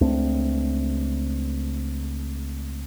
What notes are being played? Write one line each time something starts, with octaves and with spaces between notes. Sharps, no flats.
C#2 A3 C4 D4